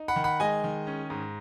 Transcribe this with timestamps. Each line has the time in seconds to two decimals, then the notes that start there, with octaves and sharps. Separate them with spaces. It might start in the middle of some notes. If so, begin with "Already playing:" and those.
Already playing: D#4
0.08 F#5 B5
0.16 D#3
0.24 F#5 B5
0.40 G#3 D#5 G#5
0.64 D#3
0.87 C#4
1.10 G#2